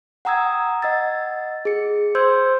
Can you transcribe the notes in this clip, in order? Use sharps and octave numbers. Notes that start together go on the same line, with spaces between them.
F#5 G5 A#5 D#6 E6 G#6
D#5 F#5 E6 A6
G#4 C#7
C5 C6 E6 G6 G#6